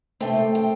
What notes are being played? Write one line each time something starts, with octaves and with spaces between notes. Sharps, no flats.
C3 A3 C4 G5
G5